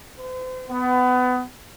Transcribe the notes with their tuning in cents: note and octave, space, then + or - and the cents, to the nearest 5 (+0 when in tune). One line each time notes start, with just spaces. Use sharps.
C5 -40
B3 +25